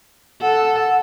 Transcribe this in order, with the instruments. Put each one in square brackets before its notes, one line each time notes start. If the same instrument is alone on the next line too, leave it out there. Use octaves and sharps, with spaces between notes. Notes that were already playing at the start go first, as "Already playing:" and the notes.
[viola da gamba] A4 [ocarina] F#5